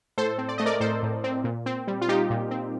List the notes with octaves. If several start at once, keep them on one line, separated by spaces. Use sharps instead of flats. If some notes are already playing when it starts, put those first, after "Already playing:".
A2 A4 C5
C4
D5
A3 D#5
A#4 D5
A2 A4 C5
A2
C4
A#2
C4
G3
F4
D#4 G4
A#2
C4